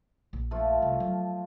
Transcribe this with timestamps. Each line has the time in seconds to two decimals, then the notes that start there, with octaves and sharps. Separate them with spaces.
0.33 A#1
0.51 F3 A3 F4
0.82 C2
1.00 F#3 D#4